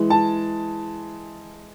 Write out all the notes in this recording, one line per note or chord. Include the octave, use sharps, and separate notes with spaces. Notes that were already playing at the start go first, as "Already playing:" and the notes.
Already playing: E3 G#3
A5